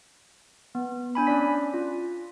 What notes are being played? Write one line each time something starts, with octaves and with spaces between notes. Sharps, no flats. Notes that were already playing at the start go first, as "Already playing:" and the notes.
B3
D4 G#5 B5
C#4 D4 D5 B6
F4